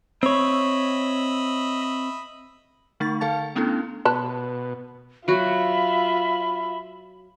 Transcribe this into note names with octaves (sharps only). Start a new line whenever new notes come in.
C4 C#5 D#5 E5 B5
D3 A3 D#4 C#6 A6
D3 A4 F5 A5 A6
A3 B3 C#4 D4 E4 A4
B2 B4 A5
F#3 F4 F#4 E5 B5